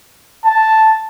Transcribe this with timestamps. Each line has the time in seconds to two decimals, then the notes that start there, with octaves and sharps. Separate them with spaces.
0.45 A5